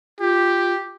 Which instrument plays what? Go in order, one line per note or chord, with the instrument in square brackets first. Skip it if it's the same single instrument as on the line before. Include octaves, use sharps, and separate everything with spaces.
[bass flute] F4 [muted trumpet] G4